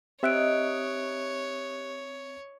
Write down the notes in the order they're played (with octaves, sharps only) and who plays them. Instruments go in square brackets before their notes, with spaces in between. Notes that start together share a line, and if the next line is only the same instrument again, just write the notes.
[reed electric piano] C4 E5 [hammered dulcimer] D#4 D#5 [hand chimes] G4 F#6 D7 [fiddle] C#5